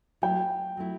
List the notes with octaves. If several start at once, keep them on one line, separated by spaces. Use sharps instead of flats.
F#3 A3 E4 G5
F#3 A3 E4